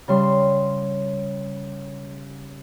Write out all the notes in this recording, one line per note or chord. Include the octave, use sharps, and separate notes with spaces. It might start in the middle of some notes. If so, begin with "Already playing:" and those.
C#3 G3 C6